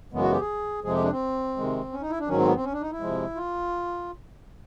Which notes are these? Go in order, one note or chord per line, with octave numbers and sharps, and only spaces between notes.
F#2 C#3 E3 G#3 B3
F#4
G4
G#4
F2 C3 F3 G#3 G#4
G4
D4
C4
C3 D#3 G#3
C#4
D#4
E4
D4
G#2 D#3 F#3 C#4
C4
B3
C4
C#4
D4
D#4
E4
C3 F3 G#3
F4